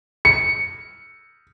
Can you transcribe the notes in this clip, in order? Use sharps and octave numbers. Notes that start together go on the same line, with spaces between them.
C#7